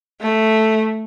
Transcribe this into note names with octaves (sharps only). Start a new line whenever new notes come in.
A3